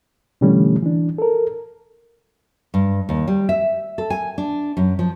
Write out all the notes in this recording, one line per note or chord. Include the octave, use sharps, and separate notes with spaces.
B2 D3 E3 G3 A3 C#4
E3 D4
A4 A#4
G2
D#2
G3
E5
A4
G#5
D4
F#2
F3